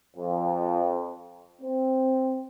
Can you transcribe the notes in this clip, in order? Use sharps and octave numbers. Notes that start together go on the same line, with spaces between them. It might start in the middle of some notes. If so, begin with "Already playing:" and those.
F2
C4